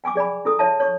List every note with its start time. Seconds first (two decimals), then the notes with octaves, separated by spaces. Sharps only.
0.04 G5 G#5 C#6 D6
0.15 G#4 D5 G#5 B5
0.45 E4 A4 D#6
0.59 E4 C#5 E5 A5
0.80 C#5 C#6